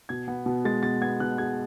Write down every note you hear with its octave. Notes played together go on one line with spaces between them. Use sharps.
B2 G#6
B3
B2
G#3 A6
B2 A6
B3 G#6
B2 F#6
G#3 G#6